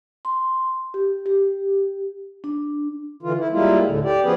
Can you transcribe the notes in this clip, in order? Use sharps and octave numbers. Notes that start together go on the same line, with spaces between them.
C6
G4
G4
D4
D3 E3 F4
E4
G3 G#3 A#3 E4 F4
D2 A2 D3
G4 D5
F3 B3 C#4 G#4 B4